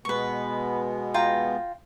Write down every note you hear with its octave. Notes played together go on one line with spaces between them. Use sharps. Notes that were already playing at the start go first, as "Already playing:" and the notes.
B2 G#3 B3 B4 C#6
F4 G5 A#5